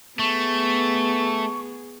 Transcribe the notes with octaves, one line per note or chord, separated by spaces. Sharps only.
A3 B3 G#4 C#6